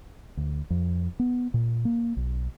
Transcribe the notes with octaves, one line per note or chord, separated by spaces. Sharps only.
D2
F2
B3
A#2
A#3
B1